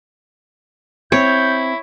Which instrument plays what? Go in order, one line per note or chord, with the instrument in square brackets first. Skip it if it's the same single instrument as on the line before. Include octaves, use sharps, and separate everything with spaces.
[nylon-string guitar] C4 [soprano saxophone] E4 [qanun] C#5 [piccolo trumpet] G6